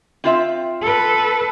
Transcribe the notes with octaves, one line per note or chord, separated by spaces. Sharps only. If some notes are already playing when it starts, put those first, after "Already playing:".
C4 F4 E5
A4 B4